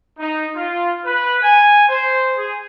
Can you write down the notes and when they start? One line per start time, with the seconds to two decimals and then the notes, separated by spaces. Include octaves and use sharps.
0.19 D#4
0.56 F4
1.05 B4
1.43 G#5
1.89 C5
2.38 G#4